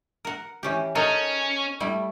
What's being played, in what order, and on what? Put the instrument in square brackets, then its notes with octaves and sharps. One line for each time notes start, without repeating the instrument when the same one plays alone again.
[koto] A#4 F#5
E3 C#4 G4
[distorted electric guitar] C#4 [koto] D#4 A4 A#4
[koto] G3 A3 E4